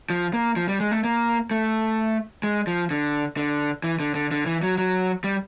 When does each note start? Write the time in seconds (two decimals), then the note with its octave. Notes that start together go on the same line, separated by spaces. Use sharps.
0.10 F3
0.34 A#3
0.56 F3
0.68 G3
0.80 G#3
0.91 A3
1.04 A#3
1.51 A3
2.43 G#3
2.67 F3
2.91 D3
3.37 D3
3.83 E3
4.00 D3
4.15 D3
4.31 D3
4.46 E3
4.63 F#3
4.78 F#3
5.24 G3